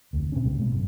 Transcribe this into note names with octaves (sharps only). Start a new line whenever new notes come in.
F1 D2
B2 C4 C#4
C2 A#2 C#3 G3
B2 G#3 A3 B3
G#1 F#2